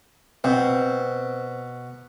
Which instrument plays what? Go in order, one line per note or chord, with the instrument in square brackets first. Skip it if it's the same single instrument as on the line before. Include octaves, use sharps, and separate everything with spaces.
[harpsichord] B2 [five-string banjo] C4